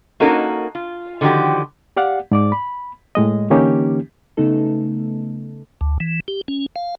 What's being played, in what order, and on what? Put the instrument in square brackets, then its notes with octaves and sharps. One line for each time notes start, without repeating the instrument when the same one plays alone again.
[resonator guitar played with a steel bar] A#3 C#4 D#4 F#4 A4 A#4
F4
D3 D#3 F3 F#4 G4
[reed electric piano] G4 D5 F5 F#5
G#2 D5 D6
B5
A2 G#3 D#5
D3 E3 A#3 C#4 D#4 G4
[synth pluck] C#3 A3 B3 D#4 A4
[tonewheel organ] D2
E3
G4
C#4
F5